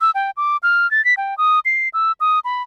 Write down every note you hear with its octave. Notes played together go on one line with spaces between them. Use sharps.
E6
G5
D6
F6
A6
B6
G5
D#6
C7
E6
D#6
B5